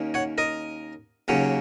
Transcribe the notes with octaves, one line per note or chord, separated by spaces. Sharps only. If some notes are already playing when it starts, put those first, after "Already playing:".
Already playing: D#2 D#3 A#3 C#4
C#5 F#5
A#4 D#5
D#2 C#3 F#3 A#3 C#4